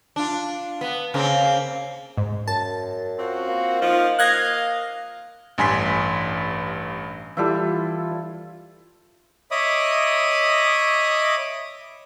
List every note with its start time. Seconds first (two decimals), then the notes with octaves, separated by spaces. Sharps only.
0.16 D4 F4
0.81 B3
1.14 C#3 A#3 C4
2.17 G#2
2.48 F#2 A5
3.18 C4 F4 F#4
3.48 A#3
3.80 F3 D#4 F4
4.19 A#3 D#5 F5 F#6 G#6 A#6
5.58 A1 G2 G#5 C6 B6
7.37 E3 G3 E4 F4 A4
9.51 C#5 D#5 E5 B5 D6 D#6